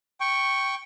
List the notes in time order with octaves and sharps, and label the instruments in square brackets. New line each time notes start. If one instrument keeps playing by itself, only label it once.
[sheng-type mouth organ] G5 C#6